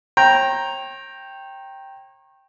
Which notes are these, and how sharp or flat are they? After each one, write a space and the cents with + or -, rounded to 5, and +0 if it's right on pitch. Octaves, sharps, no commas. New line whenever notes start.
C#5 -40 G5 +0 A#5 +0